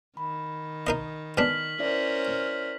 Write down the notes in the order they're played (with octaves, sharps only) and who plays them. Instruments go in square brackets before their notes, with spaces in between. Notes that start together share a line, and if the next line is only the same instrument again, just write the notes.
[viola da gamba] D#3 [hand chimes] B5
[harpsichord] D#4 A#4 D#5
[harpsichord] B2 G#3 D4 [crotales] F6 B6 F#7
[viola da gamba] C#4 A#4 C5 [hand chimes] E4 D5 E5